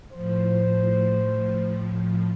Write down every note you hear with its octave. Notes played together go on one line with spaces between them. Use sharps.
A2 F3 C5